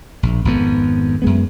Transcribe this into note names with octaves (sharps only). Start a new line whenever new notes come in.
A#1
G#1 F2 B3
F#2 G#3 B3